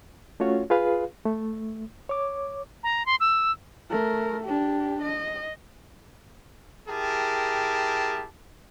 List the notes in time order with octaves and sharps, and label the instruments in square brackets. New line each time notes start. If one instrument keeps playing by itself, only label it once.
[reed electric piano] A3 C#4 F4 F#4 C#5
F4 G#4 B4 F5
A3
C#5 D6
[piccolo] A#5
C6
E6
[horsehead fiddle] A3 A#4
D4 G4
D#5
[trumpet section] E4 G4 G#4 A#4 G5 A5